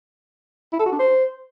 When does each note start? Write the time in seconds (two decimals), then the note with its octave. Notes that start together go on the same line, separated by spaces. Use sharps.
0.73 E4
0.79 A4
0.86 F#4
0.92 D4
0.99 C5